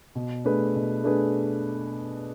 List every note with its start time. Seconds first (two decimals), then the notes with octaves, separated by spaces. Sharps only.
0.15 B2
0.45 A3 D4 G#4 B4
0.75 B2
1.04 A3 D4 G#4 B4